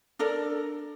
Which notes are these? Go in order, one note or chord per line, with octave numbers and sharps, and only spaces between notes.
D4 A4 A#4 D5